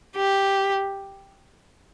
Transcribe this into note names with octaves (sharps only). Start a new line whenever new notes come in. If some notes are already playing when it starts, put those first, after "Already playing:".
G4